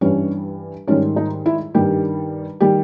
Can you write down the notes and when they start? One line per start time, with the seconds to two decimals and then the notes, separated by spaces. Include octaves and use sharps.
0.01 G2 E3 G3 C#4 C#5
0.87 G#2 D#3 G3 C#4 C#5
1.16 D#4
1.46 E4
1.74 G2 D#3 G3 G4
2.60 D#3 G3 G4